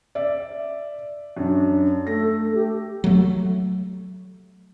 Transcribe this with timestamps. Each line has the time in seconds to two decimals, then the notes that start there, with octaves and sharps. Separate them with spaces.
0.15 D5 E5
1.37 F#2 D4
2.07 A3 A4 A#6
2.54 G4
3.04 F#3 A3